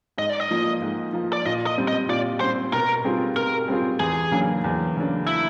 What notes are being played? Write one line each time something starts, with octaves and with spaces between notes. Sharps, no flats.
G#2 D#5
D5
D#5
F3 A#3
G#2
F3 A#3
D5
A#2 D#5
D#5
G3 C4
D#5
A#2 D5
G3 C4 C5
B2 A#4
G3 C4 F4 G#4
B2 A#4
G3 C4 F4 G#4
E2 G#4
C#3 F#3 A#3 D4
E2
C#3 F#3 A#3 D4
E4